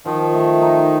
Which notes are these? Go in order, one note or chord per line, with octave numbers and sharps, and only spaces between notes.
D#3 F3
A3
D#4